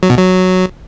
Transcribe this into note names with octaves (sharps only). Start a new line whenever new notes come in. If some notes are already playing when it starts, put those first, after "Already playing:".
F#3
B2
F#3